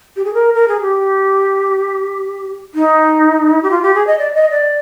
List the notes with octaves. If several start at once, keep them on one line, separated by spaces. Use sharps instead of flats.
G4
G#4
A#4
A#4
G#4
G4
D#4
G4
F4
G4
G#4
D#5
D5
D#5
D5